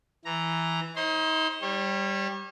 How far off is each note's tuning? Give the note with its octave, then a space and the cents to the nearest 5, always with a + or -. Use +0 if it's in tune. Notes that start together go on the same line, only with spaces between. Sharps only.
E3 +0 A#5 +0
D#4 +30 C5 +40 C6 -15
G3 +0 C#5 -35